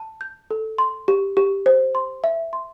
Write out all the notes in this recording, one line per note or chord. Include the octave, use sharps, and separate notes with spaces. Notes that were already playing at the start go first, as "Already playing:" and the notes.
Already playing: A5
G6
A4
C6
G4
G4
C5
C6
E5
C6